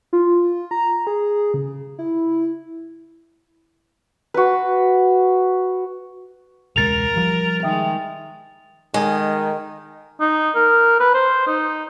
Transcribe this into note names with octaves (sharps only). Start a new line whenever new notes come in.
F4
A#5
G#4
C#3
E4
F#4 B4
E1 C#2 G#3 A#4 A6 F7
F3 G3
D#3 G#3 E5 G5 D#6
D#3 G#3
D#4
A#4
B4
C5
D#4